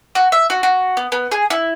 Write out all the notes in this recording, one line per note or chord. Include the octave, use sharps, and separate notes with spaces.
F#4
E5
F#4
F#4
B3
B3
G#4
E4